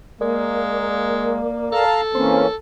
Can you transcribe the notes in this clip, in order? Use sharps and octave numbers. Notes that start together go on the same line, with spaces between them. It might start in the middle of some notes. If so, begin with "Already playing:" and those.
G#3 A#3 A#4 D5
A4 F5 A5 A#5
E3 A#3 C4 C#4 C5 C6